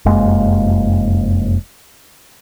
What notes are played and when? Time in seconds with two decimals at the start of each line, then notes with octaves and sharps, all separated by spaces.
0.05 F1 F#2 G#3 A#3